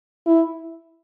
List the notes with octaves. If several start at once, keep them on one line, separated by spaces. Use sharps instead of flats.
E4